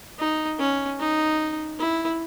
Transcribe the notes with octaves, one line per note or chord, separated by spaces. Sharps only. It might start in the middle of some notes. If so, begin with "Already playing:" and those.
D#4
C#4
D#4
E4